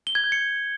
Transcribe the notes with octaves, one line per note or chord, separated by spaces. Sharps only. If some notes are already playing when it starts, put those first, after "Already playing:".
G7
G#6
G6
C#7